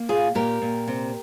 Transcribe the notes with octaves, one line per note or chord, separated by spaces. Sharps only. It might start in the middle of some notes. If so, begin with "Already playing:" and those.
Already playing: A#3
A#2 F4 G#4
A#2 G4 A#4
A#2
C3